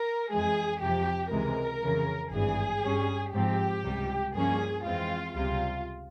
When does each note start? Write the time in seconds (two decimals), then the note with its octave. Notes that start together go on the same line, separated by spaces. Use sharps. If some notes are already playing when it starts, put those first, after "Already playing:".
Already playing: A#4
0.30 F2 E3 G#3 G#4
0.81 F2 C3 F3 G4
1.31 C#2 C3 E3 G#3 A#4
1.82 F2 C#3 E3
2.32 G#1 G2 E3 G#4
2.83 G2 G3 C#4
3.33 G#2 F3 C4 G4
3.84 C#2 C3 G3
4.35 G2 F3 A#3 C#4 G#4
4.85 F2 E3 G#3 C4 F4
5.35 C#2 C3 G3 F4